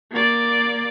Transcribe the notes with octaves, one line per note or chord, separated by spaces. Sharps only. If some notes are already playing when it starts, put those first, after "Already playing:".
A#3 D5